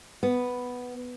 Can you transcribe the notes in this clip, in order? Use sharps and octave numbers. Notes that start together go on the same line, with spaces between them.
B3